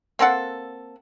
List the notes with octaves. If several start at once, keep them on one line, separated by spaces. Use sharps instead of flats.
A#3 C4 A4 F#5